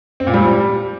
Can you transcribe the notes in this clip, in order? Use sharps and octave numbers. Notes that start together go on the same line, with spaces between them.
C4
A#2
G3